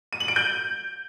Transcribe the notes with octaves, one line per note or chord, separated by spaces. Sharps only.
D#7
F#7
D7
G6